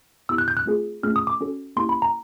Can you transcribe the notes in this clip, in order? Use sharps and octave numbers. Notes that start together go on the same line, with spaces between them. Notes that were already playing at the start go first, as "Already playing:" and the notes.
B3 E4 G4 E6
F#6
G6
F#6
A3 C4 F4 G#4
A3 C#4 F4 G#4 F6
D#6
D6
C#4 F#4 A4
A#3 C#4 E4 G4 C6
B5
A#5